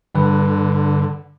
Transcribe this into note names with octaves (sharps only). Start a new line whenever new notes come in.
G2 D3 B4